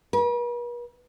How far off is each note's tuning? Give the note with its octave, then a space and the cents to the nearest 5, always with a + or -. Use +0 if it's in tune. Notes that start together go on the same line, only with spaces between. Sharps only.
B4 -45